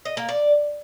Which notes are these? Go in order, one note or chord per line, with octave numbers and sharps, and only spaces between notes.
D#5
A#3
D5